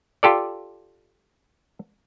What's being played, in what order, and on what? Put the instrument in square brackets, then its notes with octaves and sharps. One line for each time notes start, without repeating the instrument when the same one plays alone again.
[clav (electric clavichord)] F4 G4 A4 D5